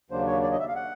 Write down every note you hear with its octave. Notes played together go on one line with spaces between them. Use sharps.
D#2 C#3 F#3 A#3 D4 C5
C#5
D5
D#5
E5
F5
F#5